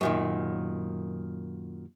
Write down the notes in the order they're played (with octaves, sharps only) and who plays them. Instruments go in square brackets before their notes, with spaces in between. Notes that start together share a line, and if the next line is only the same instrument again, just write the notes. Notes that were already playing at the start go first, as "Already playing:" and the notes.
[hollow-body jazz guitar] F#2 A#2 D#3